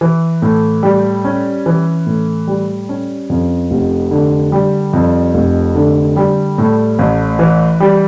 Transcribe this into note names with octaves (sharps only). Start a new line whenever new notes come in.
E3
A2
G3
C#4
E3
A2
G3
C#4
F2
F1
D3
G3
F2
F1
D3
G3
A2
A1
E3
G3